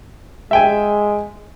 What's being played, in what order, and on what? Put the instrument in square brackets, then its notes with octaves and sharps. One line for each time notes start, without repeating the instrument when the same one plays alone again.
[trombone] G#3 [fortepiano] E5 G5 G#5